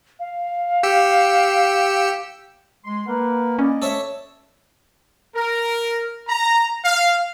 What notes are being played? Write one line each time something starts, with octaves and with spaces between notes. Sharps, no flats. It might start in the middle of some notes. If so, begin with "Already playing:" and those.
F5
G4 E6 C#7
G#3 C6
A#3 A#4 B4 F#5
C#4 D5 D#5
A4 C#5 E5
A#4
A#5
F5